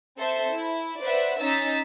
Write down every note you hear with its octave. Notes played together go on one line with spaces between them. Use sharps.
C4 A4 C5 E5 A5
E4
B4 C5 D5 E5 F#5
C#4 D#4 E6 A6 B6